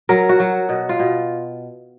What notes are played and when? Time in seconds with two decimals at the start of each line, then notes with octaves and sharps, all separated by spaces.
0.09 F#3 A#4
0.29 F#4
0.40 F#3
0.69 B2
0.89 F4
0.99 B2